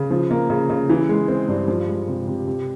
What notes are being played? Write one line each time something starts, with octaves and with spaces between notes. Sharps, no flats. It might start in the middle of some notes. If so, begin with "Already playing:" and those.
Already playing: C#3
F3
A#3
C#3
C#3
E3
G#3
C4
G2
F3
G#3
C3
C3
C3